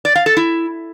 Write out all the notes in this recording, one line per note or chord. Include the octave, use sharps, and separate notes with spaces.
D5
F5
A4
E4